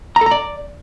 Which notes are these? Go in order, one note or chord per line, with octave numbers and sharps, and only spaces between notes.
A#5
A4
A#5
D5